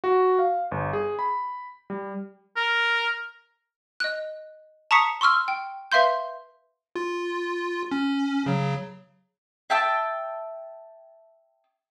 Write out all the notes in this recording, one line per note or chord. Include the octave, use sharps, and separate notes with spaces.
F#4
F5
G1
G#4
B5
G3
A#4
D#5 F#6
A5 A#5 C#6 D#6 B6 C#7
C6 C#6 E6 F6
G5
B4 E5 F5 C6 G6
F4
C#4
C#3 F#3
E5 G5 A5 E6